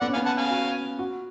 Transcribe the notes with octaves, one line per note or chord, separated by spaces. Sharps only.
B3 D5 F#5
C#4
B3 F5 G#5
F#5 A5
F5 G#5
F#4
F#4